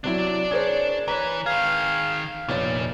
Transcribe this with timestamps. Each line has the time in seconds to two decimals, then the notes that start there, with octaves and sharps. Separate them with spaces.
0.04 C3 F#3 D4 E4 D5
0.51 G#4 A#4 C5 C#5
1.08 E3 B4 C#5 A#5
1.46 D#3 G#4 F5
2.49 F1 A#2 C#5 A6